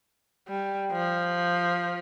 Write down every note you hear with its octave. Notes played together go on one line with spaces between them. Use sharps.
G3
F3